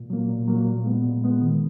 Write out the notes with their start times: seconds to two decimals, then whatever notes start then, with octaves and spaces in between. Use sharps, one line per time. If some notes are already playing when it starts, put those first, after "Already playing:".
Already playing: A#2
0.10 F#3 A#3
0.29 A#2
0.48 F#3 A#3
0.67 A#2
0.85 G#3 B3
1.04 A#2
1.23 G#3 B3
1.42 D#3